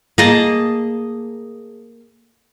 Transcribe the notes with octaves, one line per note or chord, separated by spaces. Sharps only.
A#3 G#4 D#5 A5